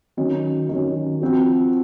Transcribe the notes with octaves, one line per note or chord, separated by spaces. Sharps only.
D#3 F#3 C#4
D#3 F#3 C#4
F3 C4 F#4